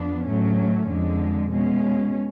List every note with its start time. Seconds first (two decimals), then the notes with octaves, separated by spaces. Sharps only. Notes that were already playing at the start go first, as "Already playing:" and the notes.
Already playing: F2 F3 B3 D4
0.27 A2 F#3 A3 C#4
0.89 F2 D3 G#3
1.51 B2 G#3 C#4